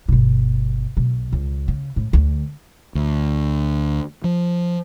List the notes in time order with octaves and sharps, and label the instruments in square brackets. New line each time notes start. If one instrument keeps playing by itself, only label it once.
[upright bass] G1 B2
B1 B2
C#2
C#3
A2
D2
[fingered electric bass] D2
F3